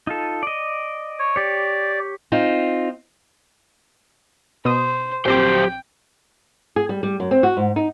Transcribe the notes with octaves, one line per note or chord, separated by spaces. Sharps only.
D#4 F4 A4
D5 D#5
C#5
G4 C#5 D5
C4 D#4 F4
B2 C5 D#6
A#1 F#3 C4 G4 C5 G5 D6
G#4
G3
G3
F#2
C4
F#4
G#2
D#4